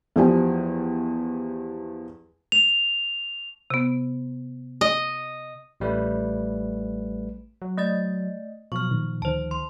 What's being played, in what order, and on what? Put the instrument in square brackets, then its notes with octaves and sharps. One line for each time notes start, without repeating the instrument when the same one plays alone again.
[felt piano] E2 F3 G4 G#5
[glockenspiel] F7
[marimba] C3 B3
[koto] D#5
[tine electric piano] A1 G3 A3 B4
[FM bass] F#3
[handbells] A3 D5 A6 [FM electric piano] D#5
[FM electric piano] B2 F#3 [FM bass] F3 [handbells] C#6 F6
[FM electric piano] A#2 D#3
[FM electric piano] D2 D#3 [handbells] C5 A5
[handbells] C6